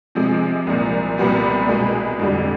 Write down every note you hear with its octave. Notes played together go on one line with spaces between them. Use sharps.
C3 F3 G#3
C2 A#2 F3
C2 A#2 G3 B3
C2 B2 G#3
F2 D3 G3